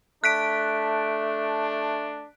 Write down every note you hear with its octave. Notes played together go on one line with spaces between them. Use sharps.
A3 D4 F#6 B6 D7